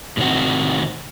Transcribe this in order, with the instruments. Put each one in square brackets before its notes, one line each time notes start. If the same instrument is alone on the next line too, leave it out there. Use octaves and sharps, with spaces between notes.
[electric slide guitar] A2 C3 D#3 C4 F#4